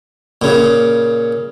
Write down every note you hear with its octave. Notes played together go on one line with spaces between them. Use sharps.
A#2 C#3